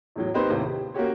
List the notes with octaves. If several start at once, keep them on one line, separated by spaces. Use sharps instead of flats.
E2 A2 F#3
A#3 C4 D#4 G4 B4 C5
D#2 A2 C3
G4
A#3 C#4 F#4 G4 C#5